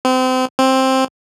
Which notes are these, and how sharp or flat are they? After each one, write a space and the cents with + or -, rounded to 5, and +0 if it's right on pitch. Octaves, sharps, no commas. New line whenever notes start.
C4 -30
C4 +10